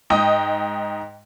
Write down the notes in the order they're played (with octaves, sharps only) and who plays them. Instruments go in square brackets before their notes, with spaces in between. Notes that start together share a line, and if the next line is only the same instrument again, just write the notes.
[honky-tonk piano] G#2 D#5 G5 D#6